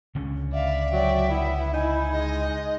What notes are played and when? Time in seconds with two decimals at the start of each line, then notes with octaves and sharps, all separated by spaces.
0.15 C#2 D3 C#4
0.53 D5 E5 F5
0.93 F#3 D5 G5
1.31 B3 E4
1.74 D#4 E4 G#5
2.12 G#3 D#5